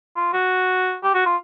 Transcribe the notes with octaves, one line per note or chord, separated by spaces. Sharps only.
F4
F#4
G4
F#4
F4